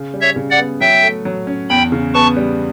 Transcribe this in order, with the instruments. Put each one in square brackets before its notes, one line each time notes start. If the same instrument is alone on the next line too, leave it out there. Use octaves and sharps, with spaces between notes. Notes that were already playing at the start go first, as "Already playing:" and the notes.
Already playing: [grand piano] C#3
G3
[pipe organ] C#5 E5
[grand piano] C#3
[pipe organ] D5 F#5
[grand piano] B3
[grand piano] F#3 [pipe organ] E5 G5
[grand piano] A3
F#3
C#4
[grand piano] E2 [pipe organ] G5 B5
[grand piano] C#3
[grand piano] B3 [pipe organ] A5 C#6
[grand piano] G3